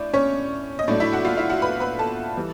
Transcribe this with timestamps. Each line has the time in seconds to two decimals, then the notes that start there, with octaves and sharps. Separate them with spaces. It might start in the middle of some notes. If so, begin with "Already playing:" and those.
Already playing: A2 D4 D5
0.14 C#4 C#5
0.79 D#5
0.88 A2 F#3 A3 D4 D5
1.00 E4 E5
1.12 F#4 F#5
1.25 F4 F5
1.37 E4 E5
1.50 F#4 F#5
1.62 B4 B5
1.80 B4 B5
1.99 A4 A5
2.37 E3 G3